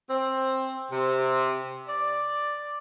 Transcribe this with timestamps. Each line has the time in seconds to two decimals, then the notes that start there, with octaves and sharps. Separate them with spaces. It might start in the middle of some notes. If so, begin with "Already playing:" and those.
0.09 C4
0.92 C3
1.88 D5